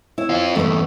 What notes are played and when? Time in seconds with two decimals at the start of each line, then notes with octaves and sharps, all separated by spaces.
0.18 E4 C#5
0.29 C4 F4
0.56 E2 G2 A3 B4